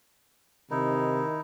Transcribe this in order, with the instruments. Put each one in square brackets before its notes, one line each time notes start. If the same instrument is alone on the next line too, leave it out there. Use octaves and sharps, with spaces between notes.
[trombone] C3 [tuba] D#3 [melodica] D#4 E4